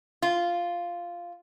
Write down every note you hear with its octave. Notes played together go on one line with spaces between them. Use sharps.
F4